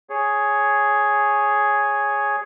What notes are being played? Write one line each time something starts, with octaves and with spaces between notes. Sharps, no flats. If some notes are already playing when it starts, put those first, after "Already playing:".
G#4 C#5